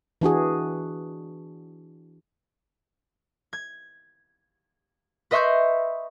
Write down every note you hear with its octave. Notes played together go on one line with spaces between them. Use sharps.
E3 D4 F#4 G#4
G#6
B4 D#5 E5 C6 C#6 G6